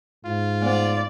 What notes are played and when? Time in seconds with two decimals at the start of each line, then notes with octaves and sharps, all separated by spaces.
0.25 G#2 F4
0.62 A3 B3 C5 D5